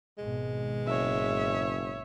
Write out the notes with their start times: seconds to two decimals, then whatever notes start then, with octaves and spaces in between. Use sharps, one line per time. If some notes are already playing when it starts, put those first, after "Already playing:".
0.18 G#1 B2 G#3
0.87 F#1 C#5 E5